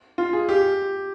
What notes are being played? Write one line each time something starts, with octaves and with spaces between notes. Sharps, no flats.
F4
G#4
G4